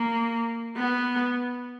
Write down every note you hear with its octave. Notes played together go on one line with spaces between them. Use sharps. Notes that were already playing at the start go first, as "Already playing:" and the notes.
Already playing: A#3
B3